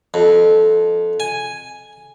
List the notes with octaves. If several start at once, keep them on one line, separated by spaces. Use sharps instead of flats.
F2
G#5